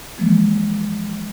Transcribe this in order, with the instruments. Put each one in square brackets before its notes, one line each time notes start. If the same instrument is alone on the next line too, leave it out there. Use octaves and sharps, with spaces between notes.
[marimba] E3 F3 G#3 A#3